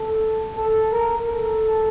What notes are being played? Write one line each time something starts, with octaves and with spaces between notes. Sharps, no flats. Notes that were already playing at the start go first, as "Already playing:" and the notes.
Already playing: A4
A4
A#4
A4